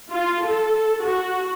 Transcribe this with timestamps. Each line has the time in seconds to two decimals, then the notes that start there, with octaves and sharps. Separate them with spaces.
0.11 F4
0.44 A4
1.03 F#4